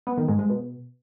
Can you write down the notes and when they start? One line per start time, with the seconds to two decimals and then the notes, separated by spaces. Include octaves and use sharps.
0.07 B3
0.17 D#3
0.28 G#2
0.39 G#3
0.50 B2